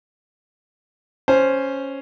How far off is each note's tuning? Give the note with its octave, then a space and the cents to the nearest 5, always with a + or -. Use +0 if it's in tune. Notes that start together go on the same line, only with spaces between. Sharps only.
C#4 +0 C5 +5